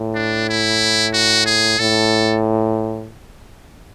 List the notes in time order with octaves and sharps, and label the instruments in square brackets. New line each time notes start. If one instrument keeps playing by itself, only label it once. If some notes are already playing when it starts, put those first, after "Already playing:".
Already playing: [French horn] A2
[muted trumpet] D4
E4
F#4
G#4
[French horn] A2 [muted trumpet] A4